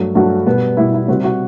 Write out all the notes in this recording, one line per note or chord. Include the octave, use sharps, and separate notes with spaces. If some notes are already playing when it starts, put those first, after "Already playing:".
Already playing: G2 F#3 A3
G2 F#3 A3 F#4
B2 G3 B3
B2 G3 B3 E4
E4
C3 G3 C4 F#4
F#4